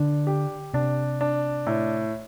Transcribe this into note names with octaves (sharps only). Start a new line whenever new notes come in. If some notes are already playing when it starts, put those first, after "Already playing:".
Already playing: D3 D4
G4
C3 D4
D4
A2